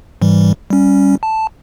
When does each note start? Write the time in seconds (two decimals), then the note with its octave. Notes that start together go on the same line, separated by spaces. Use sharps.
0.22 G#2 E3 G3
0.70 G3 C#4
1.23 A5